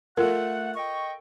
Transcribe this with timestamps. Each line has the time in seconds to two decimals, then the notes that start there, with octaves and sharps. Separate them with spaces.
0.17 A3 F4 A4 A#4 F#5
0.75 D#5 G5 C#6